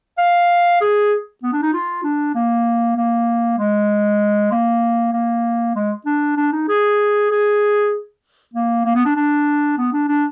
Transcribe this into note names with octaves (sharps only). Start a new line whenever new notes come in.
F5
G#4
B3
D4
D#4
F4
D4
A#3
A#3
G#3
A#3
A#3
G#3
D4
D4
D#4
G#4
G#4
A#3
A#3
B3
D4
D4
B3
D4
D4